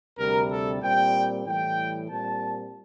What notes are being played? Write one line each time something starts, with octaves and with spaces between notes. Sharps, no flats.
D2 C3 G3 A#4
A4
A#2 G3 C4 G5
A2 E3 G3 G5
A#2 G3 C4 A5